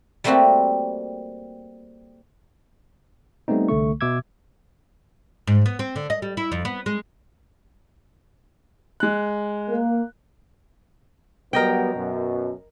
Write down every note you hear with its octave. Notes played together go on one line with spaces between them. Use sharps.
G3 A3 A#3 C4 F#4 G4
G3 A3 B3 C4 D#4
C2 D3 A3 C#6
B2 E5 D6 E6 G#6
G#2
B3
C4
D3
D#5
G3
E4
F2
B3
G#3
G#3 F#6
A#3
F#3 G3 B3 A#4 D#5 G5
F#2 B2